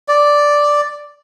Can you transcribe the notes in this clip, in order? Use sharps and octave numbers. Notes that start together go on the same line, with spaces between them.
D5